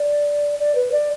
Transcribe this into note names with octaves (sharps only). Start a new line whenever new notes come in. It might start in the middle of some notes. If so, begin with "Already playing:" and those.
Already playing: D5
D5
B4
D5